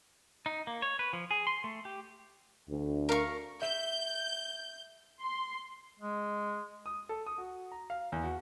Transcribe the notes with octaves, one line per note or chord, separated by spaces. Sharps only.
D#4
A#3
C#5
B4
F3
G#4
C6
A3
G4
D2
A#4 F5 C#6
E5 G6
C6
G#3
D#6
A4
D#6
F#4
A#5
F5
E2
F#4